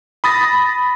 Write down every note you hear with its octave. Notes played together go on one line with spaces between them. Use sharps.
B5 D#6 A6 A#6